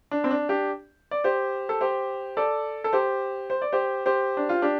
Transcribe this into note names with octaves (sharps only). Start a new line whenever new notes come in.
D4
C4
D4
D4 G4
D5
G4 C5
A4
G4 C5
A4 D5
A4
G4 C5
C5
D5
G4 C5
G4 C5
D4
F4
D4 G4